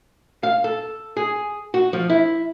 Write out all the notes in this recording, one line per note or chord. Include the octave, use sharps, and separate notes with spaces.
F5
A4
G#4
F#4
F3
E4